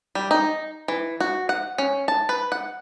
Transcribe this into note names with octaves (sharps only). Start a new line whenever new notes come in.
G3
D#4
E3
F#4
F#5
C#4
A5
B4
F#5